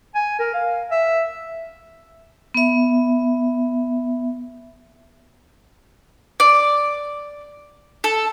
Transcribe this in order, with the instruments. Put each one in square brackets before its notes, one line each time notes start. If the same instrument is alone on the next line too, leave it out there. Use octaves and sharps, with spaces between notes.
[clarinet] G#5
A#4
F5
E5
[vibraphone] B3 E5
[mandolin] D5
A4